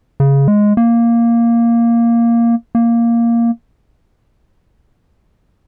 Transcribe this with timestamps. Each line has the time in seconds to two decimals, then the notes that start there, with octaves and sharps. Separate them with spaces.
0.20 C#3
0.48 G#3
0.77 A#3
2.75 A#3